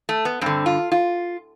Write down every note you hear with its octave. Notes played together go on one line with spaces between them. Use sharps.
A3
B3
G2 D3 C4
F4
F4